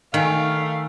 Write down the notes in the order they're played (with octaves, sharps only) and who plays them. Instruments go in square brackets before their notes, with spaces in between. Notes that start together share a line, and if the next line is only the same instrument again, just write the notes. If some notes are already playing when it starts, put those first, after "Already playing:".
[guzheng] D#3 [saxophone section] A3 [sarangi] F5 [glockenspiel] G#5 F6